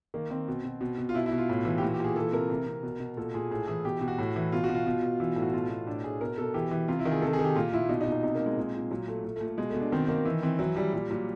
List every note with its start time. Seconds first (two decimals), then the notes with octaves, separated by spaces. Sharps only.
0.14 D#3 A#3
0.30 D#3 C4
0.48 B2
0.65 B2
0.81 B2
0.98 B2
1.09 F4
1.14 B2 E4
1.26 E4
1.31 B2
1.38 F4
1.49 A2
1.65 E3
1.78 G4
1.82 A#2 F#4
1.94 G4
2.00 A#2 G#4
2.16 E3 A4
2.33 C3 A#4
2.50 C3
2.67 C3
2.83 B2
3.00 B2
3.17 A#2 A4
3.34 A#2 G#4
3.51 A2 G#4
3.67 E3 G#4
3.85 B2 G4
4.01 B2
4.08 F#4
4.18 A2
4.36 E3
4.52 B2 F4
4.64 F#4
4.69 B2
4.75 F4
4.87 B2
5.03 B2
5.20 E3
5.36 A2
5.42 F#4
5.53 B2 F4
5.70 B2
5.87 A2 D4
6.04 A2 G#4
6.21 B2 A#4
6.38 B2 A4
6.54 E3 G4
6.71 E3
6.88 C3 F4
6.99 E4
7.05 D#3
7.11 G#4
7.22 C3 A4
7.33 G#4
7.39 D#3
7.44 G4
7.55 A#2 F4
7.73 A#2 E4
7.89 B2 D#4
8.01 D#4
8.06 B2
8.12 D#4
8.23 C3 D#4
8.35 C3 A#3
8.46 G#3
8.57 A#2
8.74 A#2
8.91 A#2 F#3
9.08 A#2 A3
9.24 A#2 A3
9.36 A3
9.41 A#2
9.48 A3
9.58 B2 G#3
9.69 A3
9.74 B2
9.80 D4
9.92 D#3 C4
10.08 D#3 A#3
10.25 E3
10.43 E3 C4
10.59 E3 F#3
10.76 E3 G3
10.93 A#2 G3
11.10 A#2 F#3